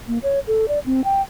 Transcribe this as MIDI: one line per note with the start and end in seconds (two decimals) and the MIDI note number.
0.08 0.18 58
0.23 0.40 73
0.47 0.68 69
0.68 0.79 74
0.86 1.01 60
1.04 1.22 79